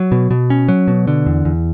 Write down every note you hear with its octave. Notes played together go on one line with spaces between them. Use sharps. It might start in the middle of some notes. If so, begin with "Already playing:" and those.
Already playing: F#3
B2
B2
C#4
F#3
B2
D3
E2
E2